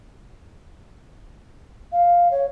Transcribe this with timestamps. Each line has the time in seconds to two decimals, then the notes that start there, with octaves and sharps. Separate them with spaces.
1.92 F5
2.31 C#5